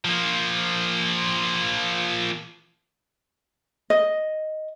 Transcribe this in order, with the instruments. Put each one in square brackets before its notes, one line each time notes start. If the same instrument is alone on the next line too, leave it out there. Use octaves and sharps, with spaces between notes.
[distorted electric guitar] F3 A#3
[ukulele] D#5